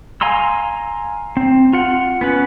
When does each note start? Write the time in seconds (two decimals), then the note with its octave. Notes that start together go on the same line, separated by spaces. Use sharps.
0.21 F5 G#5 A#5 C6 E6
1.37 C4
1.73 F4 F#5
2.21 B3 C#4 B4